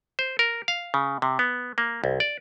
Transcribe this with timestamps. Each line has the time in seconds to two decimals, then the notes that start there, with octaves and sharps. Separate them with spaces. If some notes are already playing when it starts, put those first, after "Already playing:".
0.19 C5
0.39 A#4
0.68 F5
0.94 C#3
1.22 C3
1.39 B3
1.78 A#3
2.04 C2
2.20 D5